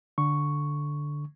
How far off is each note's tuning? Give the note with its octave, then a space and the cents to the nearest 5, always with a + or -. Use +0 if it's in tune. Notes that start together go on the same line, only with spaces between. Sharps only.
D3 +0 C#6 +0